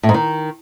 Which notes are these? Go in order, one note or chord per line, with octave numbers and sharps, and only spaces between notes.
A2
G#2
D#3